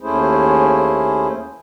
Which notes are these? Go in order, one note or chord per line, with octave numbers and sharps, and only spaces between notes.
D#2 A3 C#4 E4 G#4 C5